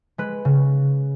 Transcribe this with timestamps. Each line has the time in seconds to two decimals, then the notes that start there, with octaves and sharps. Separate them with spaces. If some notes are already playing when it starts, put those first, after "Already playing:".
0.18 G#3 B4
0.45 C#3